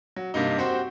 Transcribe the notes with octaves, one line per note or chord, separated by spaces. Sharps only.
F#3
G2 C3 A#3 D#4
C4 F#4 G4 C5